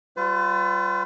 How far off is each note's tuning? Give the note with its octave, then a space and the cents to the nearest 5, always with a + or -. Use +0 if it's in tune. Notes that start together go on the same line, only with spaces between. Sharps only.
G3 -25 F4 +10 B4 +45